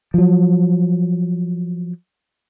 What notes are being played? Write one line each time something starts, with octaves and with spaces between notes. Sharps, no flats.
F3 F#3